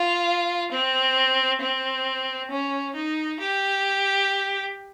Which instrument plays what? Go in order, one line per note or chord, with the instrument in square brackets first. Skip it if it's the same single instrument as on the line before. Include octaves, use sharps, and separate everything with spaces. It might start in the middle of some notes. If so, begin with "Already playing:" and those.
Already playing: [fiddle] F4
C4
C4
C#4
D#4
G4